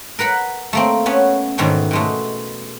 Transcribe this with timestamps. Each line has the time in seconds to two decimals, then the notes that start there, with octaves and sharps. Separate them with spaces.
0.19 A#4 B4 F#5 B5
0.73 A3 A#3 C4
1.06 A3 B3 C#4
1.58 G#2 B2 D#3 E3 A3
1.91 B2 G#3 A3